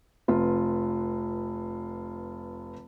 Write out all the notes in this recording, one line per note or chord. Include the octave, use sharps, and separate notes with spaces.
F1 F4 B4